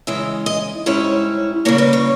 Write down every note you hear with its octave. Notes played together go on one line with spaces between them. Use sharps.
C#3 E3 G#3 D#4 E5
D#5
G#2 G3 C#4 E4 C#5
C#3 G3 A#3 C#5
B4
C#5